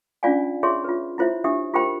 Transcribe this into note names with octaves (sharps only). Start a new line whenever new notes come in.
C#4 D4 F4 D5 F5 G#5
F4 G#4 C#5 E5 C6 C#6
F4 B4
E4 F4 C5 C#5 E5
D4 G4 E5 D#6
F4 G4 A#4 C5 G5 B5